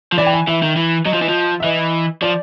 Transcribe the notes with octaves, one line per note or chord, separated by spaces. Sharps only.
F3
E3 D5
G5
G#5
E3 E5
D#3
E3
F#3 D#5
F3
E3
F3
E5
E3 D#5
F3 D5